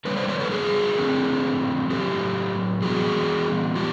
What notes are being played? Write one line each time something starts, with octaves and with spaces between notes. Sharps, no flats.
D3 G3 A#3 B4 C#5
C5 D5
B4 C#5
A4 B4
G#4 A#4
D3 F3 A3 C4
A2 F#3 A3 C4 G4 A4
E3 G3 B3 F#4 G#4
E3 F4 G4